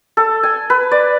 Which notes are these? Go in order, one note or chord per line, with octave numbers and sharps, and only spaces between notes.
A4
G#5
B4
D5